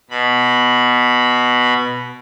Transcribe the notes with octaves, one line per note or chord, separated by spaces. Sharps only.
B2 B5